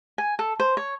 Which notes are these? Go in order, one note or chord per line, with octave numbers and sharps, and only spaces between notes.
G#5
A4
C5
C#5